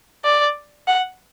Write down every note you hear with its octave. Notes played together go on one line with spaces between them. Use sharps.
D5
F#5